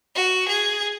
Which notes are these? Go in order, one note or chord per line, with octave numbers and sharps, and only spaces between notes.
F#4
G#4